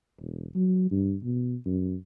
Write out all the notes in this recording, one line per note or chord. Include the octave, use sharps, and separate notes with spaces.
E1
F#3
G2
B2
F#2